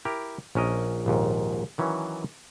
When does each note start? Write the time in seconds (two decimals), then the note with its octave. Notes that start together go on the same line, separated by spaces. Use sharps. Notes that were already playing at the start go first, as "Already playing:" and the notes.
0.05 E4 G4 A#4
0.55 A#1 C#4 A#4 D#5
1.06 A#1 D#2 G#2
1.78 D#3 E3 F#3 C#4